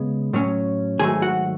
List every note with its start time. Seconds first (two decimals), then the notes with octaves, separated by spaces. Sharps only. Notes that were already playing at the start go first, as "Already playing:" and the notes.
Already playing: C#3 G#3 B3
0.33 A2 F#3 C#4
0.99 G#2 D#3 F#3 A3 G#4 G#5
1.22 F#4 F#5